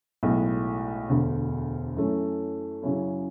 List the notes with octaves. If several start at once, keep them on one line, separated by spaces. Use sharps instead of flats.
B1 A2 G#3
E1 D2 D3
F#2 E3 A3 C#4
F#2 C#3 F#3 C#4 E4